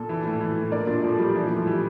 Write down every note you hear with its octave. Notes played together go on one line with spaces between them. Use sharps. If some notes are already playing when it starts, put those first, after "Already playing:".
Already playing: A#2 A4
E3
A2
E3
A2
A#2 A#4 D5
A#2 D4 F4
A#2 F3 A3
A#2 G3
E3 F3
A2
F3
E3 G3